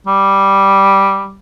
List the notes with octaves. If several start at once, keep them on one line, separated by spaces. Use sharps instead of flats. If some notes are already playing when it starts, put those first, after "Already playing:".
G3